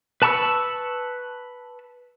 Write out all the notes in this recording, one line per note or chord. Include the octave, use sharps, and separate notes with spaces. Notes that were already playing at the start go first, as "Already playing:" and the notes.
B4 A5 B5 C#6 E6